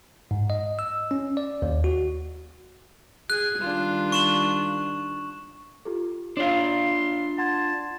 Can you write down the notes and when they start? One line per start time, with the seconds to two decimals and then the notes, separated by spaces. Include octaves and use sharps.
0.31 G#2
0.50 D#5
0.79 E6
1.11 C#4
1.37 D5
1.62 D#2
1.84 F#4
3.30 G#4 F#6
3.60 D#3 G3 D4 F4
4.12 C#6 E7 F#7
5.85 F4 G4 A4
6.37 D4 F4 C#5 F5 C6
7.38 F#5 A5 C6 G#6